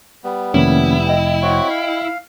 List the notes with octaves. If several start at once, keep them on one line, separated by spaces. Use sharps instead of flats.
G3 B3
F1 D#3 A#3 C#4 E4
D#5 G5
C4 F#4 C#5
F5